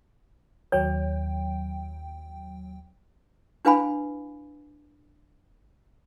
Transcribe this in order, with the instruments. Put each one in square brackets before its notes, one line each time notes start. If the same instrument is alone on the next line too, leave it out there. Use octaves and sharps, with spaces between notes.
[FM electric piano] D#2 F#3 G5 [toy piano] C#5
[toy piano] D4 E4 B4 F5 G#5 B5